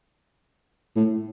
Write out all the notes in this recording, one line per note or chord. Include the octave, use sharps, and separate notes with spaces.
A2